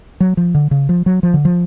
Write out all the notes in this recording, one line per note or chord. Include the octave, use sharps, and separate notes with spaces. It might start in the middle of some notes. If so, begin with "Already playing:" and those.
F#3
F3
D3
C#3
F3
F#3
F3
D3
F3